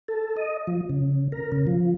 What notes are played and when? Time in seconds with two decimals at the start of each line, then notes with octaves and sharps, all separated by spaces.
0.08 A4
0.37 D#5
0.67 F3
0.89 C#3
1.32 A#4
1.52 C#3
1.67 F3